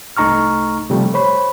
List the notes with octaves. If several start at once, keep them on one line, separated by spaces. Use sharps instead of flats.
C2 A3 D#4 A#5 C#6 F6
C3 F3 G3 A3
C5 C#5 B5